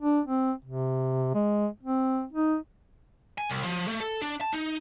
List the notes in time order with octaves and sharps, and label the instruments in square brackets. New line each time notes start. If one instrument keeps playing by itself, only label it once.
[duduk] D4
C4
C3
G#3
C4
D#4
[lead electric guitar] G#5
C2
F3
A3
A4
D4
A5
D#4